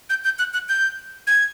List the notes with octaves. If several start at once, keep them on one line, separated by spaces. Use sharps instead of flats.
G6
G6
F#6
F#6
G6
G#6